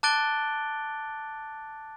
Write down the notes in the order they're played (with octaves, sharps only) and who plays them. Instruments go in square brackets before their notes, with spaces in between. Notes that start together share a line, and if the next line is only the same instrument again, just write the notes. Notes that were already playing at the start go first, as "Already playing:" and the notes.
[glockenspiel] A5 D6 F#6 A6 D7 G7